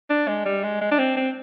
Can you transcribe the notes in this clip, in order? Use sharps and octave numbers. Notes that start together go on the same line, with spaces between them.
D4
G#3
G3
G#3
G#3
D4
C4
C4